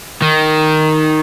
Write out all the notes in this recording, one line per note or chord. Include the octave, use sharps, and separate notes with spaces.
D#3